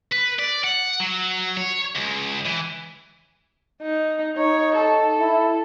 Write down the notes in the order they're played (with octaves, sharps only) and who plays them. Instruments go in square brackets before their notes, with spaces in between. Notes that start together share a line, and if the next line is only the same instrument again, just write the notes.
[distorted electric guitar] B4
D5
F#5
F#3
C#5
C#2
E3
[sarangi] D#4
[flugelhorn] D#4 [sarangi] C#5
[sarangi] A4
[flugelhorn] E4